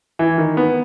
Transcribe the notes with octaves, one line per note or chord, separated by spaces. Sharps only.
E3
D#3
B3